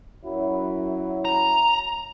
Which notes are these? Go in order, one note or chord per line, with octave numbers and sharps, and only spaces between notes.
F#2 F#3 E4
A#5